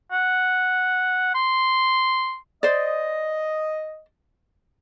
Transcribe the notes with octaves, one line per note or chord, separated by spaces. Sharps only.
F#5
C6
C5 D5 D#5